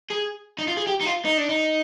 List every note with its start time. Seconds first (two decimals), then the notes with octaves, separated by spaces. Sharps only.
0.11 G#4
0.58 D#4
0.68 F4
0.77 G#4
0.87 G4
1.01 D#4
1.05 F4
1.25 D#4
1.38 D4
1.50 D#4